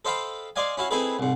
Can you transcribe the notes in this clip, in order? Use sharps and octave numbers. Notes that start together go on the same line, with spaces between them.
A4 C5 D#5 F5 G5 B5
C5 D5 D#5 F5 G#5
C#4 E4 F#4 F5
C4 D#4 E4 G#4 A4 B4
C2 G#2